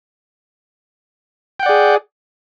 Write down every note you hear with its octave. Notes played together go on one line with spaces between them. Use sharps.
G#4 D5 F#5 G5